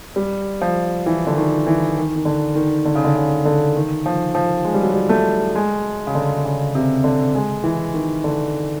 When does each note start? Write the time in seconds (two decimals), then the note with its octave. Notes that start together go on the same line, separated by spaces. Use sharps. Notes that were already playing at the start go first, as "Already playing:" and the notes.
0.16 G3
0.61 F3
1.06 E3
1.27 D3
1.37 D#3
1.67 E3
1.97 D#3
2.16 D#3
2.25 D3
2.55 D#3
2.85 D3
2.95 C#3
3.04 D3
3.15 C#3
3.45 D3
3.76 D#3
4.06 F3
4.35 F3
4.65 G#3
4.74 G3
4.83 F#3
4.92 G3
5.09 A3
5.55 G#3
6.07 C#3
6.15 D3
6.45 C#3
6.75 C3
7.04 D3
7.35 G#3
7.64 E3
7.94 D#3
8.24 D3